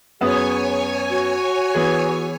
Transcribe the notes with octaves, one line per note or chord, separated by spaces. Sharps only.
F#2 B3 G#4 C#5 G#5 D#6
F#4
E3 B3 G#4